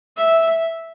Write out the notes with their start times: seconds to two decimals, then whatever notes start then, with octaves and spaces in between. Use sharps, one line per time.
0.17 E5